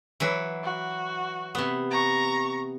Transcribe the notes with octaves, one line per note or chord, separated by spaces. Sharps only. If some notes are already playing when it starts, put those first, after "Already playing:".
E3 F#3 B4
F#4
C3 B3
A#5 C#6